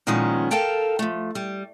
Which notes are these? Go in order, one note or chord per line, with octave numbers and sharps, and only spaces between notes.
A#2 D#3 F3 G#3 B3 C#4
A4 A#4 F5 G5 A5
F3 A3
G3